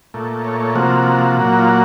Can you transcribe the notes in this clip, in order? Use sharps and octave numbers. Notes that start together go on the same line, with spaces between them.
A#2 A3
C#5
C#5
C3 F3 A#3 F#4
A#2 F#3 A#3
F4
F#4